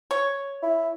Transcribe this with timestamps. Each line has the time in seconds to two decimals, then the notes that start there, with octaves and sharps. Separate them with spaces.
0.11 C#5
0.62 E4